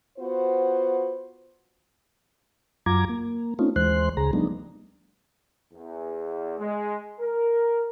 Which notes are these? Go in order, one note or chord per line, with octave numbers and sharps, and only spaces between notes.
B3 F4 F#4 C5
F#2 F#3 F4 A#5 D6 G#6
A#3
A3 C4 C#4 D#4 F4
D#2 E3 G#3 C5 C6 F#6
D2 C#3 G#4 A#5
F3 G3 A3 B3 D4 D#4
E2
G#3
A#4